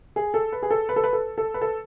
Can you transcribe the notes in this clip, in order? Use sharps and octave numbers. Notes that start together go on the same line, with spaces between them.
G#4
A4
B4
G#4
A4
B4
A4
B4
A4
A4
B4
A4